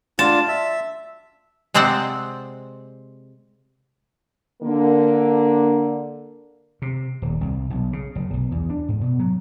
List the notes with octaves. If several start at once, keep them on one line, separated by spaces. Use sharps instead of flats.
D4 F4 A5
E5
C3 G#3 C4 C5 D5 F#5
D3 A#3
C3
D#1
C2
B1
C#3
F#1
B1
E2
D4
G#2
B2
F#3